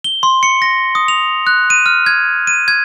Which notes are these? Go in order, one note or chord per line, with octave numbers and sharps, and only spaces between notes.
G7
C6
C#7
A#6
D#6
F7
F#6
D#7
F6
G#6
D#7
G#6